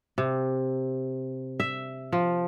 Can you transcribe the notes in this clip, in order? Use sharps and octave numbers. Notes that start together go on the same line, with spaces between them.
C3
E5
F3